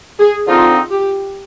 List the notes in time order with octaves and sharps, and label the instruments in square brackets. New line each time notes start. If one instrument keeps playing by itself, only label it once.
[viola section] G#4
[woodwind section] D3 F3 C4 D#4 [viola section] F4
[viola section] G4